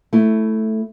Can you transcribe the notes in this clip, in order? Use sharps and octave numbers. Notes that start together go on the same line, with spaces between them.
A3 E4